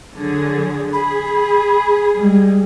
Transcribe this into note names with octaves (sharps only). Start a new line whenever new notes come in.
D3 F#3 G#4
G#4 B5
G3 G#3